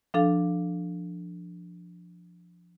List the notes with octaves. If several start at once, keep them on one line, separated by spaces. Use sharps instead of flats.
F3 D4 A4 F5